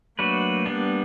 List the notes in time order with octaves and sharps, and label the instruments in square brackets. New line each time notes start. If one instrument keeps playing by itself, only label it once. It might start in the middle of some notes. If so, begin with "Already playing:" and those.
[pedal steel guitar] F#3 A3 D4 F#4 B4 [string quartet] A#3
[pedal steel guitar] G3 B3 D4